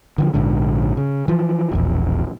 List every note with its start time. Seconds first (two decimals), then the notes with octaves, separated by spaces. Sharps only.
0.18 D3 E3 F3
0.34 A#1 G#2 D3
0.97 C#3
1.28 E3 F3
1.71 E1 A#1 E2